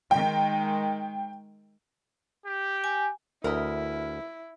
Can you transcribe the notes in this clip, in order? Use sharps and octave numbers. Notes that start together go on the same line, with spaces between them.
D#3 G#3 G5
G4
G#5
D2 E4 A#4 B4 D#5